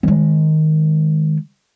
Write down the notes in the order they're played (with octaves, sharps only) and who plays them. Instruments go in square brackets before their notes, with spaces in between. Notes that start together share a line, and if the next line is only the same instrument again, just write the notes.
[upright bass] D#3 G#3